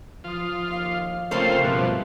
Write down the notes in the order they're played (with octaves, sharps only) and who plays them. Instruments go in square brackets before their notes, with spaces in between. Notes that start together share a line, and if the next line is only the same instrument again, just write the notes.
[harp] F3 D#6 [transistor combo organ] F4
[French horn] D#2 [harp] F5 D6 C7
[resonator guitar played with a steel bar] C#3 A#3 C#4 [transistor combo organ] A3 F4 C5 [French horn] C4
[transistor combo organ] G2 B2 [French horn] F3 [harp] C4 E5 F#6